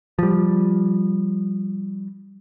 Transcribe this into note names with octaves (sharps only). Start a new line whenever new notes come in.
F3 G3